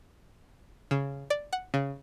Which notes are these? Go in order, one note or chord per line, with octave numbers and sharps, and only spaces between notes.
C#3
D5
F#5
C#3